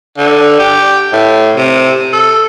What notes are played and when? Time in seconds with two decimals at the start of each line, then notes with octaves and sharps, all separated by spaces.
0.18 D3
0.59 G4
1.13 A2
1.56 C3
2.13 A4